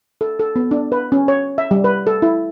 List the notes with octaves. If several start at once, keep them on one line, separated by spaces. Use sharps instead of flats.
A4
A4
B3
D4
B4
C#4
C#5
E5
G3
B4
A4
E4